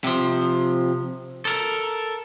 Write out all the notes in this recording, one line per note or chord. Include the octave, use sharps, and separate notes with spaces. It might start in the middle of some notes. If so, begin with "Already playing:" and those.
C3 F3
A4 A#4